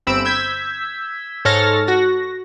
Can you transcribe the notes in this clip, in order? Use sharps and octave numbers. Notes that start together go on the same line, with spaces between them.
G1 C4 B5 E6 D7
E6 G6 G#6 B6
G#2 A4 C#5 F6 A6 A#6
F#4 A#6